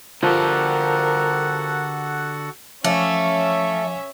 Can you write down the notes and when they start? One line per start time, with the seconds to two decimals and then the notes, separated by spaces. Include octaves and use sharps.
0.23 D3 F3 F#4 G4 A4 A#4 F#5
2.84 F3 A3 C#4 E5 F5 D6